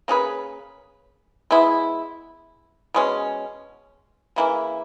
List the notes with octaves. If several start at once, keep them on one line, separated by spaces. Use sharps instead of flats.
A#3 C#4 G#4 B4
G#3 B3 E4
B2 G#3 C#4
C#3 E3 A#3 E4